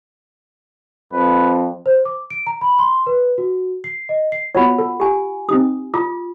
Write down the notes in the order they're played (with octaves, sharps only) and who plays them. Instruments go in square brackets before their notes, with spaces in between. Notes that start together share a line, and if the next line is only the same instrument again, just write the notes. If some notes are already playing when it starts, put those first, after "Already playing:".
[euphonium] F2 [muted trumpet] B4
[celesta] C5
D6
D7
A#5
B5
C6
B4
F#4
C7
D#5
C7
[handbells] B3 F#4 C#5 [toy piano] F4 F#5 B5
[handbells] A4
[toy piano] G4 G#5
[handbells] C4 D#4 G4 [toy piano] D#6
[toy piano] F4 [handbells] A#5 D6 D#6